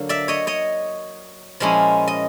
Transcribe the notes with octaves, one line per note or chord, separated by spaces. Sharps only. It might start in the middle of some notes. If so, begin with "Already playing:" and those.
Already playing: D3 F#3 A#3
D5 E5
C#5 D#5
C#5 D#5
A#2 F3 G#3 C#4 E4
D#5